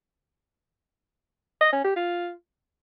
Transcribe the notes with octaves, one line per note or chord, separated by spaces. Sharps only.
D#5
C#4
G4
F4